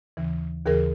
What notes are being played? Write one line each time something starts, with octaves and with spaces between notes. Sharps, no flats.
D#2 C#3 E3
D#2 C#3 E3 G#4 A#4